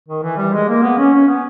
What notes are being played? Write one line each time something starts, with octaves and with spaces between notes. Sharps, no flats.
D#3
E3
G3
G#3
A#3
B3
C#4
C#4
B3